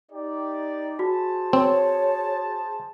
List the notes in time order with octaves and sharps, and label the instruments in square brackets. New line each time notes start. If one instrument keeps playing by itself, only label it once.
[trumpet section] D#4 G4 D5
[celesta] F#4 [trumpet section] G#4 C5 A5
[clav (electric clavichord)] C4 [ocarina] C#5